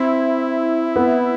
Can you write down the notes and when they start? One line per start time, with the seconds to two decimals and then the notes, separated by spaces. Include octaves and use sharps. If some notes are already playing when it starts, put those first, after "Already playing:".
Already playing: C4 E4
0.96 B3